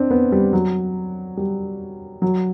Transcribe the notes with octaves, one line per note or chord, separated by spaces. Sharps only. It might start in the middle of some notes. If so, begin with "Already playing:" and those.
Already playing: C4 D4
B3
G3
F#3
G3
F#3